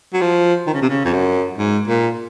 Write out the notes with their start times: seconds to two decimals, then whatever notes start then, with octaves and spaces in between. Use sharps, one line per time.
0.13 F#3
0.21 F3
0.67 D#3
0.74 C#3
0.82 C3
0.89 C#3
1.05 F2
1.13 F#2
1.58 G#2
1.88 A#2